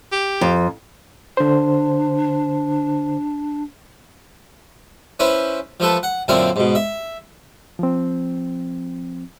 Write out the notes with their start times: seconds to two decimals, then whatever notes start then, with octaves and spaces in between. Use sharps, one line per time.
0.12 G4
0.41 F2
1.37 D3 D4 C5
5.20 C#4 E4 B4 C5
5.80 F3 A3 A4 B4
6.03 F#5
6.28 F#2 A#2 D3 C4 E4 F5
6.56 G#2 B2
6.75 E5
7.79 F3 C4